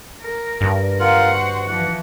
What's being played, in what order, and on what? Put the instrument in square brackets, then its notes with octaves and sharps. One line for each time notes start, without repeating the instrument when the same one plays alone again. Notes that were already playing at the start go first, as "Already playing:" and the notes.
[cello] A#4
[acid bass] G2
[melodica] F4 A#4 [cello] C5 F#5
[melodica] F#4
[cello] E3 F3 [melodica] F#5